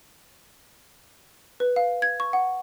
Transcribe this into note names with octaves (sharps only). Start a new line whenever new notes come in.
B4
F5
G#6
C#6
F#5